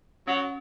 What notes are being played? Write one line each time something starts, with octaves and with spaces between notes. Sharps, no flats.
F#3 C#4